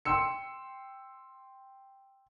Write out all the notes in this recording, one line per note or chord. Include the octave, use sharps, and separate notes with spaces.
G5 C6 E6 C#7